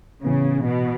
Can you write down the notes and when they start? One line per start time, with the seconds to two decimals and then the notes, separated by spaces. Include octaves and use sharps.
0.25 A2 C#3 E3 B3
0.66 B2